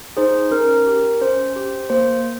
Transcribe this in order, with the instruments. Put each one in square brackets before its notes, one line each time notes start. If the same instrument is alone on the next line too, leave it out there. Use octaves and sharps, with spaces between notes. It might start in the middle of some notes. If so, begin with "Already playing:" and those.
[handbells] D#4 G#4 C5
C#4 A#4
G4
C#4 C5
G4
A#3 C5